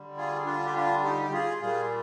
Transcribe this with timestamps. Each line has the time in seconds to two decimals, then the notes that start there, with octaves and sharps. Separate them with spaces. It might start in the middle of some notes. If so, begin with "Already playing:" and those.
Already playing: D3 G3
0.17 F4 G#4
0.46 D4 F4
0.65 G4
0.75 D4 F4
1.04 D#4 G4
1.22 G4
1.33 F4 G#4
1.61 A#2 G3 F4 G#4